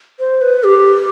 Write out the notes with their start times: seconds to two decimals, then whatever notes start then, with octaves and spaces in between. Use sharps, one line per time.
0.19 C5
0.41 B4
0.64 G4